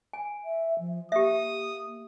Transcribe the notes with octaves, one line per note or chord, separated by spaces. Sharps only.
G#5
E5
F3
A#3 G4 E5 D#6